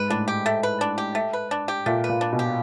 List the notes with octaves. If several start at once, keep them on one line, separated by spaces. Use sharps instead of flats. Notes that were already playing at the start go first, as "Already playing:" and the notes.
Already playing: G#2 B4
A2 D4
G4
A3
B4
D4
G4
A3
B4
D4
G4
A#2 A3
B4
A#2
D4
B2
G4